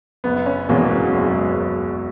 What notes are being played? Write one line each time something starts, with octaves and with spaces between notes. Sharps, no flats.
F#1 B3
C#4
E2 B2 G#3 A#3 C#4
F#3
F#1 G#3
G#3